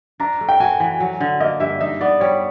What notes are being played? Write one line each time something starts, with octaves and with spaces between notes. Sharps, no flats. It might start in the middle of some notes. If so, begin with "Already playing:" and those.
D4 A#5
A3
G5
F#4 G#5
E3
F#3
D3
A#3 D#5
G2 E5
D#4 E5
B3 D5
G3 C#5